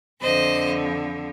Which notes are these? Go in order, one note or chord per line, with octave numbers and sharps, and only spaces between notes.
F2 D3 F3 C5 D#5